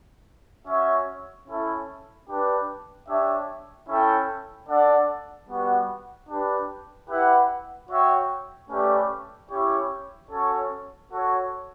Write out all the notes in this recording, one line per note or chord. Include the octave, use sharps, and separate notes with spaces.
C#4 F#4 C#5 E5
C#4 E4 A4
D4 G4 B4
D4 G4 C#5 E5
C#4 E4 A4 E5 G5
D4 A4 D5 F#5
G3 B3 F#4
D4 G4 B4
E4 G4 B4 F#5
F#4 C#5 E5 G5
A3 C#4 G4 B4 D5
C#4 E4 G4 C#5
C#4 F#4 A4 C#5
F#4 A4 C#5